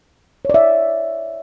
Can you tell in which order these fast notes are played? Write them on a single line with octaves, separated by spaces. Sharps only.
C#5 D5 E5